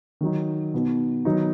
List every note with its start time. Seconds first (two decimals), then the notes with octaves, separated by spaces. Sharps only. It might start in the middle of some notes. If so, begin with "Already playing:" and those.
0.21 D#3 F#3 D#4
0.74 B2 B3 D#4
1.25 D#3 F#3 B3 D#4